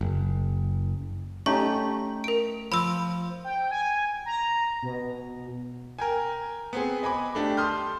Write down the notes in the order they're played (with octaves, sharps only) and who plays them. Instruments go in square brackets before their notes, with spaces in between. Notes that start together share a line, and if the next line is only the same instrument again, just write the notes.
[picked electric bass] F#1
[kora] A3 D#4 G4 [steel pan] C#4 [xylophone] C#6
[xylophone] A#4 D7
[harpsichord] F3 [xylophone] B5 E6
[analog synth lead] G5
G#5
A#5
B2
[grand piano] A#4 G5 G#5
B3 C4 G#4
D#5 G#5 B5 D6
A3 D4 G4
A5 C6 D#6 F6 G6